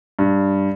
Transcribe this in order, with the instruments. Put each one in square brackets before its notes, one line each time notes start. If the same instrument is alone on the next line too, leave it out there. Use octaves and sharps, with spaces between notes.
[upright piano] G2